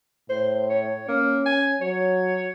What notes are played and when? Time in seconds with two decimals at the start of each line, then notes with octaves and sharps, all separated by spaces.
0.29 A2 C5
0.69 C#5
1.08 A#3 C#4
1.46 G#5
1.81 F#3 C#5